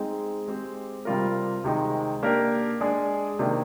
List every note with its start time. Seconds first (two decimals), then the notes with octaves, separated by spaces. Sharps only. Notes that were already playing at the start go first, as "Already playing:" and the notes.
Already playing: G#3 C4 D#4 G#4
0.48 G#3 C4 G4
1.05 C3 G3 C4 F4 A#4
1.64 C3 D#3 G#3 D#4
2.23 A#3 D4 G4 A#4
2.81 G#3 D4 G#4 D5
3.39 C3 D#3 A#3 D4